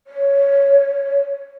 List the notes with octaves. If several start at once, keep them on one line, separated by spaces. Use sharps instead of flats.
C#5